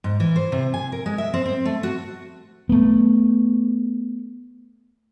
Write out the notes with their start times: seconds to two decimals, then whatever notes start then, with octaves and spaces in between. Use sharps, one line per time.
0.04 G#2
0.20 E3
0.36 C5
0.52 C3
0.74 G#5
0.92 A#4
1.06 G#3
1.18 E5
1.34 C4
1.46 C4
1.65 A3
1.83 F#4
2.69 A3 B3